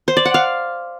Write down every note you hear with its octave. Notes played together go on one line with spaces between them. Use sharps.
C5
D5
F#5
F5